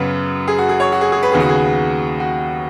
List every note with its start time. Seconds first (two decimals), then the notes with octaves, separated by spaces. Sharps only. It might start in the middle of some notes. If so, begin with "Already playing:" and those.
Already playing: F#2 C#3 B3 B4
0.48 G#4
0.58 F#4
0.69 G#4
0.80 C#5
0.92 F#4
1.01 G#4
1.12 G#4
1.23 B4
1.32 D#2 C#3 B3 G#4
1.40 F#4
1.49 G#4
2.20 F#4